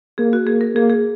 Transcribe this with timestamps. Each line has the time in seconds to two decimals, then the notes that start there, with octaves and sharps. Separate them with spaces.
0.18 A#3 G#4
0.33 F#4
0.47 A#3 G#4
0.61 A#4
0.75 A#3 G#4
0.90 G#4